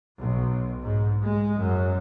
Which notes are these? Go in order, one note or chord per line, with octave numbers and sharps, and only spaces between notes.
B1
G#2
G#3
F#2